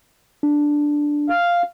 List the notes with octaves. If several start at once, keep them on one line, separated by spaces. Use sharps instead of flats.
D4
F5